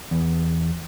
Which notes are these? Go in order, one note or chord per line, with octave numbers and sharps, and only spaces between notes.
E2